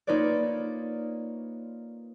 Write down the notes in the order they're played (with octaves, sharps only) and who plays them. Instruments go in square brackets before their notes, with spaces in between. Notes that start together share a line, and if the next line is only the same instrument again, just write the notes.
[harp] A#3 D#4 F4 B4 C#5 D5